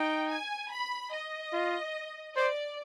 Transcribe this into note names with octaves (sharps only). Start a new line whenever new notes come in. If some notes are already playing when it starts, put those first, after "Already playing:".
Already playing: D#4 G5
G#5
B5
D#5
F4
C5 D5